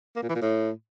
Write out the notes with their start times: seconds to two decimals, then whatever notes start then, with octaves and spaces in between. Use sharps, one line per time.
0.16 A#3
0.22 A#2
0.29 E3
0.35 A#2
0.42 A2